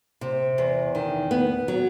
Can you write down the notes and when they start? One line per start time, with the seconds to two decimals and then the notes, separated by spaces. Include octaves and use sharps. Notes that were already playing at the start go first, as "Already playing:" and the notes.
0.21 C3
0.58 E2
0.95 D#3
1.31 B3
1.68 F#3